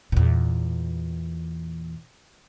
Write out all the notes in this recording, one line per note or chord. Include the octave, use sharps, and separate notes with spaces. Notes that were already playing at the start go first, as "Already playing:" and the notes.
E2 A#2